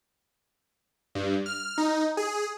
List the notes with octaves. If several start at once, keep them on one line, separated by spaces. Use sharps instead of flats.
G2
F6
D#4
G#4